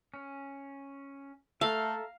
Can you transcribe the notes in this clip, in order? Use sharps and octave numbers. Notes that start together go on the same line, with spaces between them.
C#4
A3 A4 E5 F5 A#5 F6